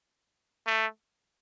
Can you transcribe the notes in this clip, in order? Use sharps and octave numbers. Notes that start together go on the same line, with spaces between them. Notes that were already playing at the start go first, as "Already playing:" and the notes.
A3